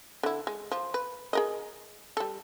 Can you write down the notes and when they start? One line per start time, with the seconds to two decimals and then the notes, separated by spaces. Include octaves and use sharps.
0.23 D3 E4
0.47 G#3
0.72 F3
0.94 B4
1.33 G#4 A#4 D#5
2.17 G3 A4